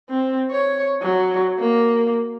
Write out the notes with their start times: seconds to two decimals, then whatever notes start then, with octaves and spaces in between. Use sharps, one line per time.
0.10 C4
0.51 C#5
1.02 F#3
1.59 A#3